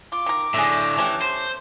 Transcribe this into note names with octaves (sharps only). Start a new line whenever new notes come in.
F4 D6
D#3 A#4
A2 D3 G#4 E5
E3 A3 C#4 G4
C5